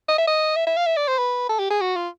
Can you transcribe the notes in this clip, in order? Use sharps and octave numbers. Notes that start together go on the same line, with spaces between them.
D#5
E5
D#5
E5
E5
F5
E5
D5
C5
B4
A4
G4
G#4
F#4
F4